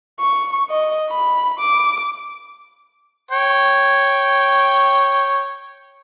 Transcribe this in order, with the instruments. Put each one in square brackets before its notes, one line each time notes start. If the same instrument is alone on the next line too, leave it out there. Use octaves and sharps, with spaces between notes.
[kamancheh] C#6
D#5
B5
D6
[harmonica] C#5 G5